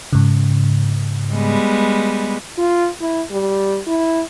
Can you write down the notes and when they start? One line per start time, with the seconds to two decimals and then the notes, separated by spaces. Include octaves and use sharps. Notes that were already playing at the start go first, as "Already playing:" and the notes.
0.13 G#2 C#3
1.32 G3 G#3 B3
2.58 F4
3.01 E4
3.31 G3
3.87 E4